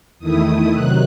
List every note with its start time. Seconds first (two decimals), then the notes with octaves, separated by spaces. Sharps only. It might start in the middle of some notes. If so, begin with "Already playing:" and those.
0.19 E2 D#3 A3 E4 D#6
0.73 C3 D#3 F#3 F#6